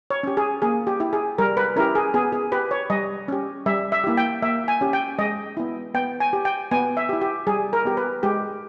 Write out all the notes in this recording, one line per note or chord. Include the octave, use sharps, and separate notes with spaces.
C#5
C#4 G4
G#4
A#3 G#4
G4
E4 G4
G#4
G3 A#4
B4
C#4 E4 G4 A#4
G#4
B3 G#4
G#4
G4 B4
C#5
G3 D#5
C#4 G4
G3 E5
E5
A#3 E4 G4
G5
A#3 E5
G#5
C#4 G4
G5
G#3 D#5
B3 E4
B3 G5
G#5
G4
G5
B3 G#5
E5
G4
E4
G4
G3 G#4
A#4
B3 G4
B4
G#3 G4